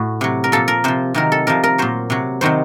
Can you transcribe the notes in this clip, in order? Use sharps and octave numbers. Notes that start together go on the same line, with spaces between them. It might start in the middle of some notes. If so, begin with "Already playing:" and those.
Already playing: A2 F#4
C3 F#3
A#4
A#2 F3 A4
A#4
C3 F3 C5
C3 D#3 F#3 A#4
A4
C3 F3 A#4
A#4
A#2 F#3 C5
C3 F#3
C3 D#3 F#3 C5